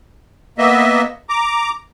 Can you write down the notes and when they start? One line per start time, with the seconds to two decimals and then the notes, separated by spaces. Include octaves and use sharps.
0.58 A#3 B3 D#5 E5
1.29 A#5 D6